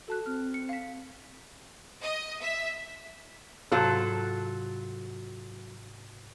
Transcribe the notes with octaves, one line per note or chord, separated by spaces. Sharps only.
F#4 A4 A5 F#6
C4 F6
C#7
F5 B6
D#5
E5
G#2 C3 F#3 F4 A4 G6